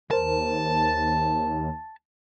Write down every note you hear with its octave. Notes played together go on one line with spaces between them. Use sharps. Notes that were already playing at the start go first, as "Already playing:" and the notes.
D#2 A#4 C5 A5